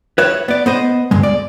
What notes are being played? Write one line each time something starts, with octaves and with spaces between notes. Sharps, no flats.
B4 C#5 E5
B3 D5
B3 C5 D#5
D2 G2 G#3
D5